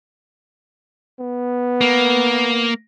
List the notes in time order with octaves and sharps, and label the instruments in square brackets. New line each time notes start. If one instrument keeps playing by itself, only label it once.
[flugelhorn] B3
[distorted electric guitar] A#3